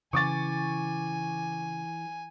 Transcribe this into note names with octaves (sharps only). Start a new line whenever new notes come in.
C#3 E3 G#5 C#6 D6 A6